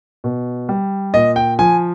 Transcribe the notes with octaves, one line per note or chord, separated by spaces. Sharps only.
B2
G3
A#2 D#5
G5
F3 G#5